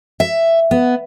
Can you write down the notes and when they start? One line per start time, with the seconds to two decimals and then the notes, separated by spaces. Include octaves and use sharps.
0.20 E5
0.71 B3